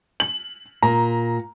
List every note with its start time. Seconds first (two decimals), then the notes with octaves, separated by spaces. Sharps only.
0.20 F#7
0.82 A#2 A#5